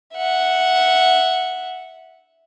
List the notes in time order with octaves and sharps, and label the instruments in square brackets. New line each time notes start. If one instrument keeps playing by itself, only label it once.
[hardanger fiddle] E5 F#5